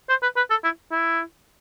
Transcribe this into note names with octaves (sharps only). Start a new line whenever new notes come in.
C5
B4
B4
A4
E4
E4